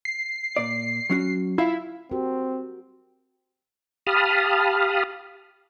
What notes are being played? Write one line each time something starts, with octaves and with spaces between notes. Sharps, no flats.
C7
A#2 D5
F#3 C#4 F#4
E4 F4 F5
C4 F#4 G4 A#4
G4 F5 A5 B5 D#6 F6